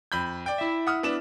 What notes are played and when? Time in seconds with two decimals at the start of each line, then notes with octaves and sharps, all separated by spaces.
0.12 F2 B5 G6
0.46 D5 G5
0.58 E4 E5
0.87 F#5 D#6 F6
1.03 B3 D4 E7